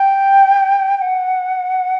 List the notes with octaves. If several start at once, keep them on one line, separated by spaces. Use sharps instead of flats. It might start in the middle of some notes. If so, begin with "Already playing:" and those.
Already playing: G5
G5
F#5